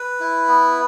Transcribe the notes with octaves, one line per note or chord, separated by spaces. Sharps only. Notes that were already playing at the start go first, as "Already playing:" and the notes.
Already playing: B4
E4
B3